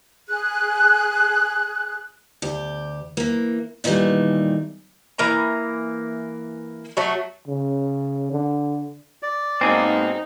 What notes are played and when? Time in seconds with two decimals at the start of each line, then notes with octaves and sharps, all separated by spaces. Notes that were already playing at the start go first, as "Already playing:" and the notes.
0.28 G#4 F#6
2.42 D2 G4
3.17 E3 A#3
3.84 A#2 D#3 E3 F#3 G3 A3
5.18 E3 A#3 A#5
6.97 F#3 A3
7.47 C#3
8.32 D3
9.23 D5
9.61 G#2 B2 A#3 C4 D#4 G#4